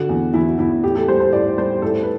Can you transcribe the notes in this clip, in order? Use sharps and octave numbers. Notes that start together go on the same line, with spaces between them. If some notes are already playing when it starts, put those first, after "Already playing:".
Already playing: D3 F#4
E2
E2 E4
E2 E4
A2 G4
A4
G3 C5
C5
A2 D5
G3 C5
A2 A4
B4